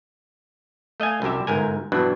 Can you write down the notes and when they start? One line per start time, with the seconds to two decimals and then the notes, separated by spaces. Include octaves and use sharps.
1.00 A3 D#5 F5 G#5
1.22 C2 F#2 C3 G4 E5
1.47 G1 G#2 A#4 G#5
1.92 G2 B2 E3 F#3 D4